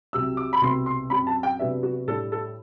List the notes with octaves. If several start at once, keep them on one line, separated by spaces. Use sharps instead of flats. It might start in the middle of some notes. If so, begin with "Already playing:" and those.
C2 C3 F#3 E6
D6
B5
C2 B2 A3 C4 C6
C6
F#2 F#3 C4 B5
A5
G5
C3 F#3 B3 D4 E5
F#4
A2 G3 D4 A4
A4